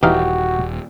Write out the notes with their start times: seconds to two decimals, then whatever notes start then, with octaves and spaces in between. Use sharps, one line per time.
0.03 D#1 E3 D#4 F#4 G4 F5